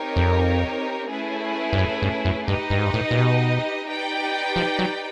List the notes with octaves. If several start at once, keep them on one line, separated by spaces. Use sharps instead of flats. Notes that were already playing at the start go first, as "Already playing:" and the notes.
Already playing: C4 D#4 G4 A#4 C#5
F2
A3 C#4 E4 G#4 B4
G2
F#2
G2
F#2
G2 D#4 G4 B4 D#5
G2
G#2
G2
A2
A#2
B2
D#4 G4 B4 D5 G5
F3
F#3